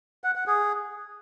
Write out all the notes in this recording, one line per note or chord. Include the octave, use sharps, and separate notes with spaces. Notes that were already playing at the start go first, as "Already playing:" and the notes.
F#5
F#5
G#4